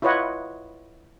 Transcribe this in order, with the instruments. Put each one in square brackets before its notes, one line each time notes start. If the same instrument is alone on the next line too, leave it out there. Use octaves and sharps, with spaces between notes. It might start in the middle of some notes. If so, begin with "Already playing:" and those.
[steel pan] E4 F4 B4 C#5 D#5 F#5